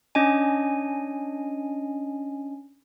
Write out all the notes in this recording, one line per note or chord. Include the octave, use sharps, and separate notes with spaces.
C#4 D4 D#5 G#5